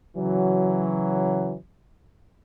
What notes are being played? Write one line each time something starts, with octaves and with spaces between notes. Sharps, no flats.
C#3 E3 F#3